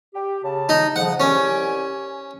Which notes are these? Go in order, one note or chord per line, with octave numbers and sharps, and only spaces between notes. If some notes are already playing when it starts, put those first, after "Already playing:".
G4
C#3 A5
D#4
F2 C#3 F3 F#5
C2 C#4 G4 G#5